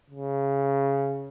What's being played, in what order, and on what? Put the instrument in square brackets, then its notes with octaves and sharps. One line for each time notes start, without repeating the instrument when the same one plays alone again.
[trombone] C#3